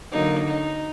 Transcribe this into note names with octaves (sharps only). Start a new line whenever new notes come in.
D3 F#3 A#3 D#4
D#4